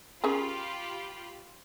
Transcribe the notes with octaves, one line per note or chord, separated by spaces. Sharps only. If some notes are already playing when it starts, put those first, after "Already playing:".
C#4 F4 G4 G#4 A#4 B5